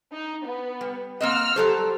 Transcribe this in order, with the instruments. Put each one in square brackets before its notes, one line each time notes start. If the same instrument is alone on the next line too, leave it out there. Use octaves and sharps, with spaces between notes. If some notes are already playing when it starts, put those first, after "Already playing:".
[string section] D#4
B3
[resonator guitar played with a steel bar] G3
[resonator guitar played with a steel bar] A#3 C4 D#5 [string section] F#5 E6 F6
[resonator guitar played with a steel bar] F#3 A4 C5 [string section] G3